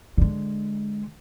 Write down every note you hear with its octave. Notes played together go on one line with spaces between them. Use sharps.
D3 G#3